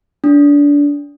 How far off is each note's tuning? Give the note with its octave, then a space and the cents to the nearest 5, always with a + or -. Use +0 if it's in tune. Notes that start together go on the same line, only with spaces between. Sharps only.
D4 -25